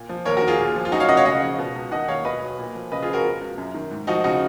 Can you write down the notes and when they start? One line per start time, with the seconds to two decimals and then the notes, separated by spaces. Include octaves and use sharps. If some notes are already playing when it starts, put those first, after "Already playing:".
Already playing: A#2
0.09 F3
0.25 D#2 A#4 C#5
0.37 F#4 A#4
0.42 D#3
0.48 F4 G#4
0.59 A#2
0.76 F3
0.85 F4
0.92 F#2 D#4 F#4
1.00 C#5 F5
1.08 C#3 D#5 F#5
1.17 C#5 F5
1.25 C#3 D#5 F#5
1.42 F3
1.59 B2
1.75 C#2
1.92 D#3 D#5 F#5
2.08 D#2 C#5 F5
2.25 B2 B4 D#5
2.42 B1
2.59 A#2
2.75 F3
2.92 C#3 B4 D#5
3.02 F4 G#4
3.08 F3
3.13 F#4 A#4
3.25 B2
3.41 C#2
3.58 F#2
3.74 D#3
3.91 G#2
4.07 F3 D#4 F#4
4.24 C#3 D#4 F#4